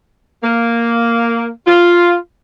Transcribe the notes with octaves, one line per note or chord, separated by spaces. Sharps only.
A#3
F4